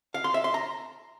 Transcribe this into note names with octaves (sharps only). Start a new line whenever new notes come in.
F5
C6
E5
C6
A#5